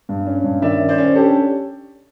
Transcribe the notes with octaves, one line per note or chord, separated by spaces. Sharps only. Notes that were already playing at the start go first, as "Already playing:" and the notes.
G2
C#4
G2
D#3 D5 E5
C#4
C5 D5
C#4
D4 G4 A4